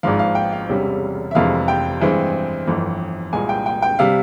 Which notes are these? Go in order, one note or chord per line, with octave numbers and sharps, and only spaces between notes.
G#1 G#2 F3 F5
F5
G5
F5
E1 E2 C3 G3 C#4
E5
F1 F2 C3 E3 G#3 F5
G5
G2 E3 G#3 C4
G1 F2 E3
C2 A#2 G#3 G#5
G5
G5
G5
C3 G3 F5